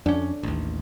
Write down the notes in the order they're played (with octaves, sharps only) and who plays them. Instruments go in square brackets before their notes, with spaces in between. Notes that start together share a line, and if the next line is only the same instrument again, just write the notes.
[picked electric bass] F2 C#4 [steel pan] D4
[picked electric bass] A1 D#2